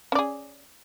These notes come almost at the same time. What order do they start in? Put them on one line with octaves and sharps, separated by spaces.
C#4 D5 G#4